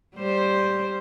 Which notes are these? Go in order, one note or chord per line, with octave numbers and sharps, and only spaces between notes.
G3 C5